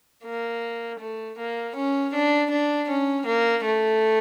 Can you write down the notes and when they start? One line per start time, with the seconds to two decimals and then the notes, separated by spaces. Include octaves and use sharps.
0.24 A#3
0.99 A3
1.38 A#3
1.75 C#4
2.13 D4
2.50 D4
2.89 C#4
3.26 A#3
3.64 A3